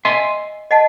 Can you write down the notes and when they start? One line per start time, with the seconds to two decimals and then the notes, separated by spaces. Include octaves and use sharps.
0.05 D#5 E5 G#5 C6
0.71 D#5 F#5 A5